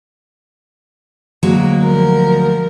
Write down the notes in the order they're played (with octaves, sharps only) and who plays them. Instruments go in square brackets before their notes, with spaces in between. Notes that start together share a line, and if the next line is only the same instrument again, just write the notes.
[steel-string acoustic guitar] D2 F#3 G#3 [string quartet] A#3
[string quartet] F3 A#4